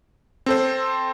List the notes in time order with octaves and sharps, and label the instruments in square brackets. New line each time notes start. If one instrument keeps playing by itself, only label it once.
[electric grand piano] C4 A4 C5